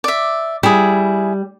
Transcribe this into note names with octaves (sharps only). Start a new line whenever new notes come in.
D5 E5
G3 E4 G#4